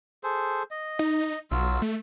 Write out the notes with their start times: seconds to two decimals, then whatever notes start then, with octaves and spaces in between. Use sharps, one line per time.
0.24 G#4 A4 C5
0.71 D#5
0.99 D#4
1.51 B1 F#3 F4 E6
1.82 A3